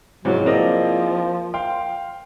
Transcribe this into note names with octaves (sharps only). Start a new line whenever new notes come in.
C#2 G#2 C3 F#3 E4 G#4
F3 A#3 C4 D5 D#5
F5 G5 C6